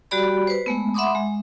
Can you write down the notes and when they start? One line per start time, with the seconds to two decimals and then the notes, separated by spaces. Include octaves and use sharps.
0.11 G3 F#4 G4 D5 B5
0.47 B4 C5
0.66 G#3 A3 B3
0.94 E5 F#5 B5 C6 D6 D#6
1.15 G#3